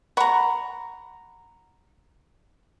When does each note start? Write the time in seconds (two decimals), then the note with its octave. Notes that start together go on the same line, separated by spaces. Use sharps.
0.17 F#5 A#5 B5 C#6